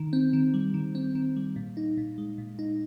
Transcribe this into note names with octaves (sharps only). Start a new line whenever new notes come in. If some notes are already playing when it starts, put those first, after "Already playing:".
Already playing: D#3
C4
D#3
G3
D#3
C4
D#3
G3
A#2
D#4
A#2
G#3
A#2
D#4